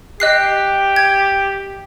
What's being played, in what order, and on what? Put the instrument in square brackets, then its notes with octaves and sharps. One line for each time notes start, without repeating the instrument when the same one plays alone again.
[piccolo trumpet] G4 [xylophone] D#5 F#6 C7
[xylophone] G#6